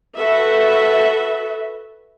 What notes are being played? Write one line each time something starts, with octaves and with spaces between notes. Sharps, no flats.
F#4 A4 B4 E5